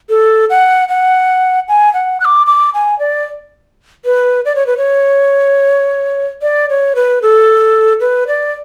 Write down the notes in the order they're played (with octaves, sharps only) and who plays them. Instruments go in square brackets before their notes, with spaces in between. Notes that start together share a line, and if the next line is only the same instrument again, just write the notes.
[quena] A4
F#5
F#5
G#5
F#5
F#6
D6
D6
G#5
D5
B4
D5
C#5
B4
C#5
D5
C#5
B4
A4
B4
D5